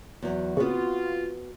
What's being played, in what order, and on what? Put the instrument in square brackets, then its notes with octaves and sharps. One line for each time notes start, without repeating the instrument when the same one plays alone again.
[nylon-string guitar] E2 F#3
[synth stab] C#3 [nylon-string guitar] B3 C4 F#4 [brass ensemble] F4